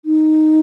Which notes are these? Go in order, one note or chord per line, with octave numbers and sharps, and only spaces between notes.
D#4